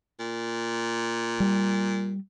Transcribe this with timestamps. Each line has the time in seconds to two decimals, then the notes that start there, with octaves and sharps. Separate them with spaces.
0.19 A#2
1.40 G3